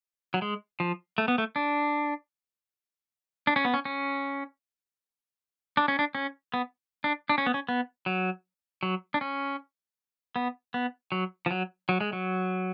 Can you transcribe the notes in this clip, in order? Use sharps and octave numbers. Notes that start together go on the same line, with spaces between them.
F#3
G#3
F3
A3
B3
A3
D4
D4
C#4
B3
C#4
C#4
D4
C#4
D4
C#4
B3
D4
D4
C#4
B3
C#4
B3
F#3
F#3
D4
C#4
B3
B3
F#3
F3
F#3
F#3
G#3
F#3